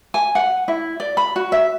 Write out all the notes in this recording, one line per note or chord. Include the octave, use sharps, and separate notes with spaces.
G#5
F#5
E4
D5
B5
F#4
E5